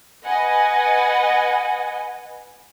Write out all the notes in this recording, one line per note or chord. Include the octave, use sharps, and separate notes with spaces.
B4 D#5 F#5 G#5